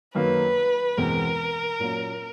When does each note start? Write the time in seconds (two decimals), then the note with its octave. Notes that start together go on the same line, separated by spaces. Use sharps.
0.14 F#2 D#3 F#3 A#3 B4
0.97 E2 B2 G#3 C4 A#4
1.80 A#2 F#3 A#3 C#4